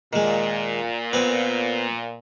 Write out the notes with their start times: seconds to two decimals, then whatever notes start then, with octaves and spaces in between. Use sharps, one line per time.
0.13 A#2 D#3 G#3
1.13 B3 C4